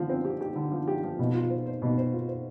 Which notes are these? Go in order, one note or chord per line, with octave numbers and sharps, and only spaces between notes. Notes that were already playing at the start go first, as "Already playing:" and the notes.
Already playing: D3 F3
C4
G4
G4
D3
F3
G4
F3
B2
F4
C5
C5
B2
C5
F4
C5